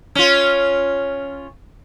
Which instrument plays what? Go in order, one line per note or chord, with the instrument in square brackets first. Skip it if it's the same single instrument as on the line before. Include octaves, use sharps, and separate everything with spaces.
[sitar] C#4 F4